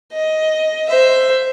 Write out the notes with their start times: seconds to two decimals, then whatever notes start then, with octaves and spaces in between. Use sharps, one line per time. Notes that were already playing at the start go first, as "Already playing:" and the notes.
0.13 D#5
0.89 C5 E5